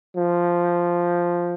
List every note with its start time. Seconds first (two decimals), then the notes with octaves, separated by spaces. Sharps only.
0.16 F3